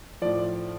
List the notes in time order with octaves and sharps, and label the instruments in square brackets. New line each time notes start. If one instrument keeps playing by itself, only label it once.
[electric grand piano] A2 F3 D5